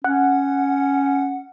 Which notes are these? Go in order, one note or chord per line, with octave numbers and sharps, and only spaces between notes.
C#4 F#5